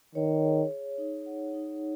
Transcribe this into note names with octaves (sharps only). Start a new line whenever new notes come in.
D#3 C#5
G#4
C#5
D#4
F#5
D#4